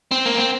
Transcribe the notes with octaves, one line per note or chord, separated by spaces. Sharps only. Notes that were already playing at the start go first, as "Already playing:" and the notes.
C4
A#3
C4